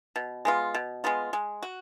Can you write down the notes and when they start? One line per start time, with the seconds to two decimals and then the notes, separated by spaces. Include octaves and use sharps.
0.16 B2
0.45 G#3 B3 F4
0.74 B2
1.04 G#3 B3 F4
1.33 G#3
1.63 F#4